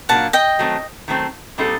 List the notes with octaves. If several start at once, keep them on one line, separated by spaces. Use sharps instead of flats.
A#2 F#3 A#3 D4 F#5 A5
D#5 G5
D#3 F#3 A3 C4
D#3 F#3 A3 C4
A#2 G3 C4 D#4 A4